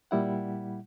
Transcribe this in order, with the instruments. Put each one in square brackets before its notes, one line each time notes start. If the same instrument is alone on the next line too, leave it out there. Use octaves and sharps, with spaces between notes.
[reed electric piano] A#2 G3 E4 F#5